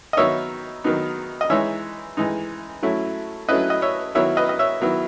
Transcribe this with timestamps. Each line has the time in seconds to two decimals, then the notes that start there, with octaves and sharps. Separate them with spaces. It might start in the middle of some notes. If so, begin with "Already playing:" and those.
0.13 D#5
0.17 D#3 F#3 B3 D#4 C#5 E5
0.84 D#3 F#3 B3 D#4
1.41 D#5
1.50 E3 G#3 D#4 C#5 E5
2.17 E3 G#3 D#4
2.83 F#3 A3 C#4 E4
3.48 F#3 A3 C#4 E4 B4 D#5
3.70 D#5
3.82 C#5 E5
4.15 D#3 F#3 B3 E4 C#5 E5
4.37 B4 D#5
4.49 D#5
4.59 C#5 E5
4.81 D#3 F#3 B3 E4